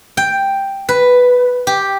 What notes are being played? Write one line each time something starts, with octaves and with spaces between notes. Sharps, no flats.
G5
B4
G4